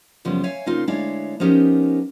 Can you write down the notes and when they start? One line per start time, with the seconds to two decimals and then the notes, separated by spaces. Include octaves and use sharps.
0.25 F#2 C#3 F3 G3 B3
0.44 C#5 E5 F5 G#5
0.66 C#3 A#3 C4 D#4 F4
0.87 D2 G#3 D4 E4 C#5 F5
1.40 F3 B3 C#4 D#4 G4 A#4